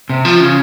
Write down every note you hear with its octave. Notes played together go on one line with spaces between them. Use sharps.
C3
F3
C#3